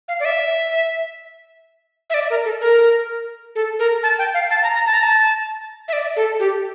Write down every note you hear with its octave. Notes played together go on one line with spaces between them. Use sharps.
F5
D5
E5
E5
D5
A#4
A4
A#4
A4
A#4
A5
G5
F5
A5
A#5
A#5
A5
A#5
A5
E5
D5
A4
G4